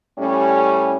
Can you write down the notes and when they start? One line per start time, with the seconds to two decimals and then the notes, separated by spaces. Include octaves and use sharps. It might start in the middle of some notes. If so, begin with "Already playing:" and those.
0.18 A2 G3 C#4